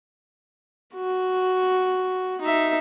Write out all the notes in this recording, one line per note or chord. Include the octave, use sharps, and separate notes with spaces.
F#4
D#4 E5